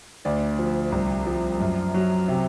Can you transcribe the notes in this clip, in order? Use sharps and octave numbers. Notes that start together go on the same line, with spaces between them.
D2 D5
F3
C2
F3
F#2
F#3
C3